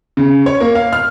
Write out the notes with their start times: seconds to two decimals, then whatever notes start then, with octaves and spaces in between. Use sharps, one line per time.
0.17 C#3
0.46 C#5
0.60 A#3
0.75 F5
0.93 F6